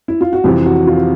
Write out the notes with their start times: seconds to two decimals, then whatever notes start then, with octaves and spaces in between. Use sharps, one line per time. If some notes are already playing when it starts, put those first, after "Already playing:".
0.08 E4
0.21 F4
0.33 F#4
0.44 F2 C3 E3 G4
0.66 F#4
0.87 F4